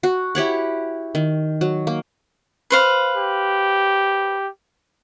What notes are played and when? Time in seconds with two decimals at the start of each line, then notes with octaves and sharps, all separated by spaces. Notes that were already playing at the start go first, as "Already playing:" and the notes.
0.03 F#4
0.35 E4 G4 C#5 F#5
1.15 D#3
1.61 F#3
1.87 A#3
2.70 B4 C5 F5
3.17 G4